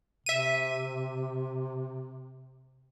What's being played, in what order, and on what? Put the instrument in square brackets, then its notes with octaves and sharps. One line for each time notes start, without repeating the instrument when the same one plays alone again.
[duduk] C3 [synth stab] E5 D#7